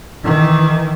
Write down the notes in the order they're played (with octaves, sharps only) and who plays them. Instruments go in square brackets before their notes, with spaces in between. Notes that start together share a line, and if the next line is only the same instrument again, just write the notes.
[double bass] D#3 E3